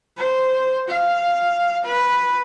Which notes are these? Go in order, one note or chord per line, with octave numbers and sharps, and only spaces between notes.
C5
F5
B4